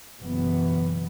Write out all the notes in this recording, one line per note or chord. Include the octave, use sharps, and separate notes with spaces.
F#1 B2 E3 B3